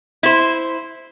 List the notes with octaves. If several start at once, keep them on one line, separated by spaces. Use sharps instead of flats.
E4 C5